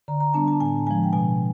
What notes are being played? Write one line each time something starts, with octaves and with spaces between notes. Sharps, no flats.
D3 A#5
A#5
G3 B3 D4 A5
A5
A2 G#5
F3 G#3 G#5
G5
B2 G#5